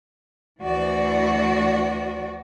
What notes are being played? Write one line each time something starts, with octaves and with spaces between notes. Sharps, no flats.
D2 E3 F#4 D5